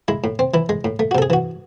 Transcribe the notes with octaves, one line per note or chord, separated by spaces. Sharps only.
G#3 E4
A2
C4
E3 E4
G#3
A2
A3
F#4
C3 A4
G#4
E3 F#4